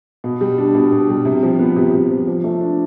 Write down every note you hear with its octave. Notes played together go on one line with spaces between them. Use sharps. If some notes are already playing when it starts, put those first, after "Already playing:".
B2
G3
D4
B2
B2
G3
C3
F3
B3
C3
C3
F3
F3
A3
D4